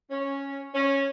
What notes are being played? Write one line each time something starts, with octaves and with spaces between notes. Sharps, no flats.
C#4
C#4